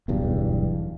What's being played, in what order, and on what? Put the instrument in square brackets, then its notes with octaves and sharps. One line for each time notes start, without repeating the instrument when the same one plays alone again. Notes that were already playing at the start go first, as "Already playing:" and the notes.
[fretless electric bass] D1 B1 E2 G2